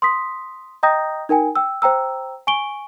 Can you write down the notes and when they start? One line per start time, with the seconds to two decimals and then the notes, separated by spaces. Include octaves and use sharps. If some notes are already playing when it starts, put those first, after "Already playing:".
0.02 C6 D#6 B6
0.83 D#5 G5 A#5 D#6 G6 A#6
1.29 D#4 A#4 G5 G#5
1.56 G5 E6
1.82 C5 G5 A#5 E6
2.47 G#5 C#6 D7 G7